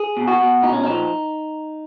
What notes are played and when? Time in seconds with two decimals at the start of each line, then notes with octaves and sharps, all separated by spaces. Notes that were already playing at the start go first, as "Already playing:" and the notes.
Already playing: G#4
0.17 B2
0.28 F#4
0.40 B2
0.63 A#2 D#4
0.73 C#4
0.84 F3 D#4